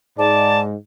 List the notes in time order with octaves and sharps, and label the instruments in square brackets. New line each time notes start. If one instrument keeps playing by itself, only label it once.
[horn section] G#2 [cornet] D5 [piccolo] A5